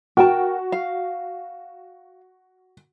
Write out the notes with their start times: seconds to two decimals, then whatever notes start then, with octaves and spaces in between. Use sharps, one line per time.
0.17 F#4 A#4 G5 A5
0.72 F5